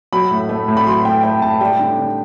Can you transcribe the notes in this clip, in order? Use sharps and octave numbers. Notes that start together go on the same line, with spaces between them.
F#3 B5
A2
A3
A2
B5
F#3 C6
A2 G5
A3 G5
A2 A5
G3 G5
D3
D3